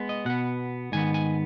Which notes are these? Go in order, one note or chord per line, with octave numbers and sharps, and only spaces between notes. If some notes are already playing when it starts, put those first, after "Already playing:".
Already playing: G#3 B3
D#5
B2 B3 F#5
G#2 D#3 B3 G#5
G#5